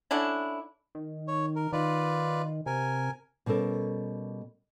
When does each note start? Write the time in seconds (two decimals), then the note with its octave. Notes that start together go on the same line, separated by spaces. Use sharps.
0.11 D3 C#4 D4 E4
0.95 D#3
1.28 C#5
1.56 A#4
1.73 D#3 F4 B4 D5
2.66 C3 A#4 G#5
3.46 B2 G3 C#4 A4 A#4